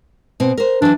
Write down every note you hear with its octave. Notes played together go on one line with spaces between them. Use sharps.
B2 C4
A#4 C5
E3 F#3 D4